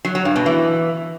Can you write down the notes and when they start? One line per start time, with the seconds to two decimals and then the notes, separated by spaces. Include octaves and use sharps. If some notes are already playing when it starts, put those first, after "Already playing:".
0.05 F#3
0.15 F#3
0.25 G2
0.36 B2
0.46 E3